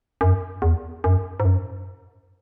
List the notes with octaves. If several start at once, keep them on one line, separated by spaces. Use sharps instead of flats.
F#2
E2
F#2
G#2
F#2